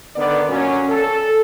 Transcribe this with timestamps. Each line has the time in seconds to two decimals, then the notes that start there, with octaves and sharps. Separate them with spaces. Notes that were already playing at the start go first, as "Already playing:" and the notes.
0.16 D3 D#3 B3 D5
0.49 A#2 F#3 C#4
0.89 A4